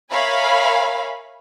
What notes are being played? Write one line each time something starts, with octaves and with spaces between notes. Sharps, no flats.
A#4 C#5 E5 F5 G#5 B5